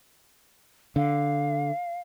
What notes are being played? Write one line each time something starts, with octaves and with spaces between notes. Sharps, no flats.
D3 F5